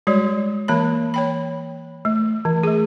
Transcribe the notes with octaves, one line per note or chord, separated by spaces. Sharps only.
G3 G#3 F#4 C#5 D5
E3 A#3 C#5 B5
C#5 G5 B5
A3
E3
A3 G#4